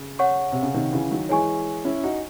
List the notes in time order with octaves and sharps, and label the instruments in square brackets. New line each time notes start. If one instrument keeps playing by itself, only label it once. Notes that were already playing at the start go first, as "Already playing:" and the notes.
Already playing: [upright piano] C#3
[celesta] C#5 F#5 C#6
[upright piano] C3
C#3
C3 D#3
C#3 E3
D#3 F#3
[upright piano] E3 G#3 [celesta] C#5 G#5 C#6
[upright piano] C#4 E4
D#4 F#4